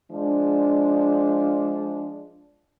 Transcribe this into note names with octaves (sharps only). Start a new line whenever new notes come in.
F3 G#3 D4